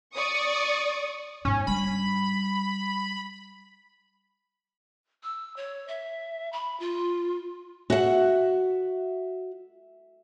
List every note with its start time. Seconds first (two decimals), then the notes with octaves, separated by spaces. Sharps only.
0.15 D5 C#6 D#6
1.45 G#2 B3 C#4
1.67 G3 D4 B5
5.23 E6
5.56 C#5
5.88 E5
6.52 B5
6.80 F4
7.90 F#4 E5 F#5